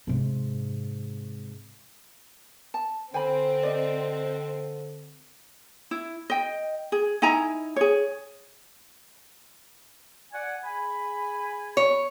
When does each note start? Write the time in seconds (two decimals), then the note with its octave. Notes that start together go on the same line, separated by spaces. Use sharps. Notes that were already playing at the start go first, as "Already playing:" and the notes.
0.07 G#2 C3
2.74 A5
3.14 D3 C4 G5 G#5 B5
3.63 D5 D#5
5.91 E4
6.30 D#5 G5
6.92 G#4
7.22 D#4 E4 G#5 A#5
7.76 G#4 C#5
10.32 D5 F#5 G#5
10.63 G#4 G#5 B5
11.77 C#5